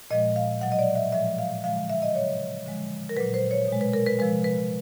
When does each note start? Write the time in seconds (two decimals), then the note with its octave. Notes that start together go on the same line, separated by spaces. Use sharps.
0.11 A#2 F3 G#3 D#5
0.36 F5
0.61 B2 F#3 F#5
0.72 D#5
0.79 D5
0.95 E5
1.12 A2 F3 G#3 E5
1.39 F5
1.64 D3 F3 G#3 F5
1.76 F5
1.90 E5
2.02 D#5
2.15 C#3 F#3 C#5
2.66 D3 F3 G#3
3.09 A#4
3.17 A#2 F#3 B4
3.34 C5
3.51 C#5
3.68 B2 G#3
3.81 B4
3.93 A#4
4.07 B4
4.19 C3 F3 G#3 B4
4.44 B4